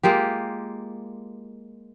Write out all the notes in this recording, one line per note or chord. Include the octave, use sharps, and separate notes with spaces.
G#3 A#3 F4 G4